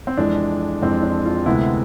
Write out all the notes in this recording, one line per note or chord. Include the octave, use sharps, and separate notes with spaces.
C4
F2 E3 G#3 D4
F2 E3 G#3 C4
D4
F4
D2 C3 G#3 B3 E4